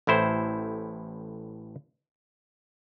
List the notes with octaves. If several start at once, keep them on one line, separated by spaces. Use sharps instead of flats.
A1 A2 E4 C5